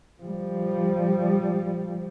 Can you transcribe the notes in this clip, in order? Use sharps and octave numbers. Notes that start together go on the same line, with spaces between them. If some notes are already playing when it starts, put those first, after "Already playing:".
F3 G3